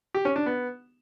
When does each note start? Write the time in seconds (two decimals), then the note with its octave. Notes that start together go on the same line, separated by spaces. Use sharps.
0.15 G4
0.25 C#4
0.36 D4
0.46 B3